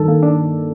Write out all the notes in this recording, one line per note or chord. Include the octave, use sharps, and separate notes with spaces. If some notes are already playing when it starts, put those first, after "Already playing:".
Already playing: G2 D#3 A4
A#3
D4